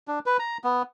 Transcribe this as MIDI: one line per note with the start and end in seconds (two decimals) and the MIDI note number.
0.08 0.19 62
0.26 0.37 71
0.39 0.58 82
0.64 0.82 59